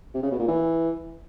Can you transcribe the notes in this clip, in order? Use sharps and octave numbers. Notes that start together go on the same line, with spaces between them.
C3
C#3
B2
A#2
E3